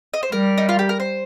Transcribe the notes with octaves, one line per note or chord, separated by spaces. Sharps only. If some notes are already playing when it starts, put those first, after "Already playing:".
D#5
C5
G3 A#4
D#4
F4
G4
A#4
C5